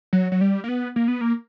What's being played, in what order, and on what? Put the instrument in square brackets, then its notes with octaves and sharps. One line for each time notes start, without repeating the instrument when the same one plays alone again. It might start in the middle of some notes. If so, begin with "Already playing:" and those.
[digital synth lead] F#3
F#3
G3
A#3
B3
A#3
B3
A#3